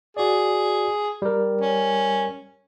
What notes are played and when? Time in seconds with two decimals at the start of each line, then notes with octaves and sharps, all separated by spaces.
0.17 F#4 G#4 D5
1.22 G3 A#4
1.61 C#4